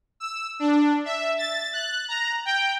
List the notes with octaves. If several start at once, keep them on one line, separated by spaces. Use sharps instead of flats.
E6
D4
E5
A6
F#6
A#5
G5